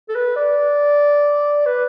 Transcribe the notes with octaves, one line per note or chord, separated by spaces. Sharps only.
A4
B4
D5
B4